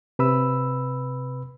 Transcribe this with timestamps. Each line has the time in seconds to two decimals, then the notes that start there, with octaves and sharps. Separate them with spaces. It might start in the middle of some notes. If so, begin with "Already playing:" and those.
0.19 C3 B4 B5 E6